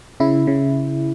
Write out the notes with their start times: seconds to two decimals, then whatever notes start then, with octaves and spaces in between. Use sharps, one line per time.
0.20 C#3 E4
0.47 C#3